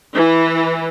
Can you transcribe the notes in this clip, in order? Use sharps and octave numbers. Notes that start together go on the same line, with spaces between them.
E3